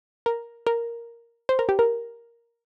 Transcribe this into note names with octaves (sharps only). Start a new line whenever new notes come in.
A#4
A#4
C5
A#4
G4
A#4